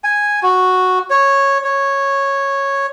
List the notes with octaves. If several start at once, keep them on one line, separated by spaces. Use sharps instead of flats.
G#5
F#4
C#5
C#5